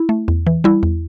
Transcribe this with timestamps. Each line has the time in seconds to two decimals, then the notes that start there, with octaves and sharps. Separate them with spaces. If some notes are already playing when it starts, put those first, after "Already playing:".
Already playing: E4
0.09 A3
0.28 E2
0.47 E3
0.64 G3 E4
0.83 E2